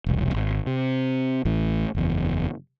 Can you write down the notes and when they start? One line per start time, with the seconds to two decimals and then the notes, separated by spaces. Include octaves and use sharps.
0.06 E1 C2
0.34 G#1
0.66 C3
1.45 A1 A2
1.95 F#1 E2